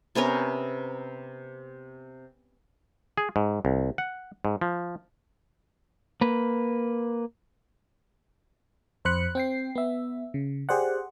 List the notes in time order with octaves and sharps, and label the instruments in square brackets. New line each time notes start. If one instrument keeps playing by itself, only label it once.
[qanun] C3 B3 C#4 A#4
[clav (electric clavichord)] G#4
G#2
C2
F#5
G#2
F3
[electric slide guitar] A#3 B4
[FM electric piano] F2 C5 B5 F#6 C#7
C4 G5 C7
B3 E5
C#3
G4 G#4 C5 D5 F#5